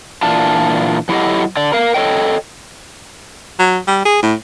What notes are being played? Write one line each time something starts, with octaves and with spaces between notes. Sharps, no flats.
A#2 E3 D4 F4 A5
F#3 E4 F#4 G4 A4 D#5
D3 D5
A#4 F5
A4 C#5 D#5 G5
F#3
G3
G#4
A2